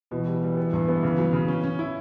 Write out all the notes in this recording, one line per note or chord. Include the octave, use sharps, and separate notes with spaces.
B2 E3
G3
G3
B3
G2
B3
C#3
F#3
C#3
C#4
C#4
E4